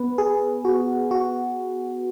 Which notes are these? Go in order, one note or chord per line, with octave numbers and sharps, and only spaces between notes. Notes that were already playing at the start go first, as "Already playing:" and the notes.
Already playing: B3 B4
G#4
F#4
F#4